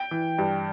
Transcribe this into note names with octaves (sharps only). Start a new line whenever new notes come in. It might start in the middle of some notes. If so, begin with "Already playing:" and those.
Already playing: G5
E3
G2